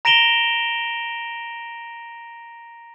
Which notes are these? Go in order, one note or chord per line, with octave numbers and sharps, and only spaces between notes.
A#5 A#6 D7 E7 F7 G7